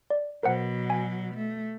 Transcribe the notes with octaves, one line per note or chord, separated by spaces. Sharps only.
D5
B2 F#3 A#4 C5 F#5
G#5
A3